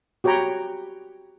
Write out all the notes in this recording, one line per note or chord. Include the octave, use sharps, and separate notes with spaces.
F#4 G4 C#5 G5 A#5 B5